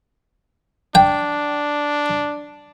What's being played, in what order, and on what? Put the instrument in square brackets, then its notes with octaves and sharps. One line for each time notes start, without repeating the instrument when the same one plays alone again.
[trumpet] D4 [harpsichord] G5